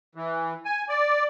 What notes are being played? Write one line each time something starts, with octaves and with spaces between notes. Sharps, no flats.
E3
G#5
D5